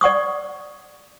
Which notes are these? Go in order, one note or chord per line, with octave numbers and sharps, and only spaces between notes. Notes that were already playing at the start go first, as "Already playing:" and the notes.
D5 F#5 C#6 D#6